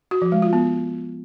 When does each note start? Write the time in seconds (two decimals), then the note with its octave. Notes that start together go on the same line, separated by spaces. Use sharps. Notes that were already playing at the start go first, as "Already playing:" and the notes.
0.11 F#4
0.22 F3
0.32 G#3
0.42 F4
0.53 B3